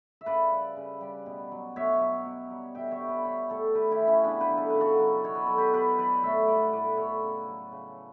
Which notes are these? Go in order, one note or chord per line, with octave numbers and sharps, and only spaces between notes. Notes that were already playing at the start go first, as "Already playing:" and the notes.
E5
C#3 B4 D5
G3
C#3
G3
B2
F#3
B2 C#5 E5
F#3
B2
G3
B2 E5 G5
C#5 E5
G3
B4 D5
G3 C#5 E5
A2 A4 C#5
A2 G4 B4
E4 G4
E3
C#4 E4
C#3 B3 D4
G4 B4
F#3
A4
C#3 B4
F#4 A4
F#3
B2 C#5
B4
F#3 A4
G4 B4
B2 G4 B4
F#3 B4 D5
A2 C#5 E5
G3 D5 F#5
A2 B4 D5
G3 A4 C#5
C#3
F#3
C#3